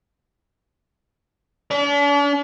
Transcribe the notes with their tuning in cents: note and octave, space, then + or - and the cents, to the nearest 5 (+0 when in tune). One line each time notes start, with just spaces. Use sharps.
D4 -45